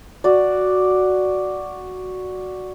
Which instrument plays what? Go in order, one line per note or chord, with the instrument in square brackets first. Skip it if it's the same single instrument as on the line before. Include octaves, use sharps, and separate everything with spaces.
[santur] F#4 D5